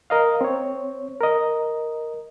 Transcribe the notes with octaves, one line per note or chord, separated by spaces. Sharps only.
A#4 D#5 F5
C4 C#5
A#4 D#5